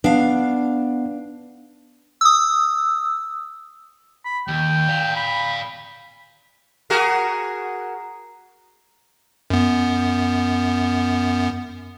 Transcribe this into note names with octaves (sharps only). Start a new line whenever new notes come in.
B3 D4 F5
D#6 E6
B5
D#2 G5
D5 F5
B5
F#4 G#4 A#4
F#2 B3